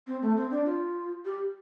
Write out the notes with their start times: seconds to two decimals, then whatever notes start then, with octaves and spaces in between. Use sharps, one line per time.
0.07 C4
0.22 A3
0.37 C4
0.51 D4
0.65 F4
1.25 G4